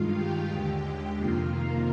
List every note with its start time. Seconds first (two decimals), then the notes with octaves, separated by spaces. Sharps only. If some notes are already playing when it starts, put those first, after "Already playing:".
Already playing: G2 D#3 G#3 F4 F5
0.14 G4 G5
0.48 D#2 D3 G#3
1.16 F2 C3 D#3 A#3 F4 F5
1.51 A#4